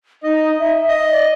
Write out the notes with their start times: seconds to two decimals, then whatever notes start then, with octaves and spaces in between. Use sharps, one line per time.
0.23 D#4 D#5
0.59 E5
0.89 D#5
1.11 D5